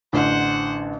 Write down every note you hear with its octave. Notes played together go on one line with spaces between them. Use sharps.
A1 D3 C5 F#5